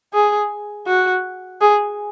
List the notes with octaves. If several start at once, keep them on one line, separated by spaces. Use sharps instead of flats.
G#4
F#4
G#4